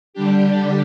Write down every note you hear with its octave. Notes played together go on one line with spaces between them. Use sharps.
D3 G3 D4 G4